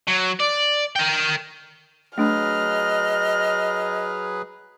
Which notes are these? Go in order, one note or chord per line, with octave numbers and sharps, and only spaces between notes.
F#3
D5
A#4 G5
F#3 A3 D4 G#4 B4 D#5 F6